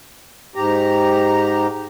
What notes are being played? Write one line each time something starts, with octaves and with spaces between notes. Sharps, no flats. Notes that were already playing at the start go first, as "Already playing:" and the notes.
G#2 G4 A#5